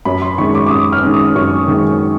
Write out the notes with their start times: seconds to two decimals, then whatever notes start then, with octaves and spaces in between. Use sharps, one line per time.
0.05 F#2 B5
0.22 C6
0.38 D#3 G#3 C#4 C#6
0.55 D6
0.66 D6
0.71 F#2 D#6
0.92 F6
1.03 D#3 G#3 C#4
1.14 D#6
1.35 F#2 C#6
1.68 D#3 G#3 C#4